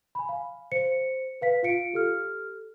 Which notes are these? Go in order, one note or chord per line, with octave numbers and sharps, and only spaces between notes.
G#5 B5
F5
C5 C#7
B4 F5 B6
F4 F5 C#7 D7
G4 A4 F6